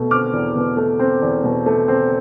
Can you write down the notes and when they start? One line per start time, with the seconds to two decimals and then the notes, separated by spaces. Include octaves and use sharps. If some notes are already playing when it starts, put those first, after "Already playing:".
Already playing: B2 A3
0.11 C4 D6 F6
0.33 E2
0.56 B2
0.77 A3
0.99 C4
1.22 E2
1.44 B2
1.66 A3
1.88 C4